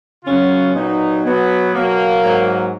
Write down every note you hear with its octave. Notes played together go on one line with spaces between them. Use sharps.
F#2 C#3 F#3 C#4 F4
A#2 F#3 B3 D#4
B2 F#3 B3
B2 F#3 A#3
G#2 F#3